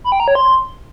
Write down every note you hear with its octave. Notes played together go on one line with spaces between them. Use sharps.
B5
G5
A#5
C#5
C6